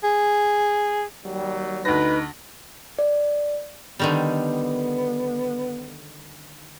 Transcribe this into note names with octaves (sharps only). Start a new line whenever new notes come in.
G#4
D#2 F#3 G3
D2 D#4 B4 A#6
D5
D3 D#3 G3 B3